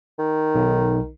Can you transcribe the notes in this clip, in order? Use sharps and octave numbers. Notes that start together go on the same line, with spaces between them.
D#3
B1